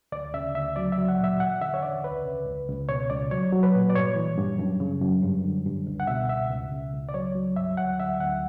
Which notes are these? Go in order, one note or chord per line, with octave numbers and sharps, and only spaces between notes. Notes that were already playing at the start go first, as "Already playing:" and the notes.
D2 D5
C#3 E5
D2 E5
F#3 D5
E5
F#3
F#5
A#2
E5
E2 F#5
D3 E5
C#5
E2 D5
C#2 B4
C#3
C#2
C#2
B2 C#5
C#2 D5
F#3 C#5
F#3
B4
A#2
D5
G2 C#5
E3
G2
F#2
C#3
F#2
G2
D3
G2
C#2
F#5
B2 E5
C#2 E5
C#2
C#3
C#2
D5
F#3 C#5
F#3
G2 E5
D2 F#5
D3 E5
D2 F#5